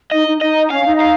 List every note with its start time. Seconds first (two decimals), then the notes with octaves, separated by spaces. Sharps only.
0.11 D#4 D#5
0.27 D#4
0.41 D#4 D#5
0.71 C#4 F5
0.85 D#4
1.00 F5